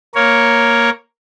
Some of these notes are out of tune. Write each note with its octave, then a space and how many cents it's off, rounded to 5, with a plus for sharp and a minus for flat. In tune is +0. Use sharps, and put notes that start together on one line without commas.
A#3 +0 A#4 +0 C#5 +0